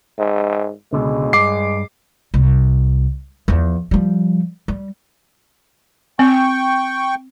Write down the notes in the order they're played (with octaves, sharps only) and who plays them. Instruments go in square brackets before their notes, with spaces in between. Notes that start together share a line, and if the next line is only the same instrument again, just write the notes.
[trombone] G#2
[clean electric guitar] C#2 B2 D3 [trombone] G#3
[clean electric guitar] G2 [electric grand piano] D6 C7
[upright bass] C2
E2 F3
F3 G3
G3
[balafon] C4 [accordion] G5 C#6